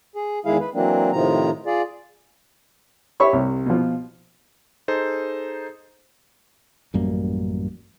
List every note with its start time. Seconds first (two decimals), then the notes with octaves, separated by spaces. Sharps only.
0.16 G#4
0.45 E2 D#3 G#3 E4 G#4 F5
0.60 B4
0.74 E3 F#3 A#3 C4 D4
1.12 A2 C3 D#3 F3 A#5
1.66 F4 G#4 D5
3.20 G4 C#5 E5 B5 C#6
3.33 C2
3.66 B2 F3
4.88 D#4 G#4 A4 C5
6.94 A1 F#2 G3 A#3